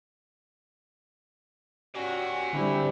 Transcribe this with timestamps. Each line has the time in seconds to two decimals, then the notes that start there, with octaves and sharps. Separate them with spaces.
1.95 C#4 F#4 G4 D5 G#5
2.53 D3 G3 C4 E4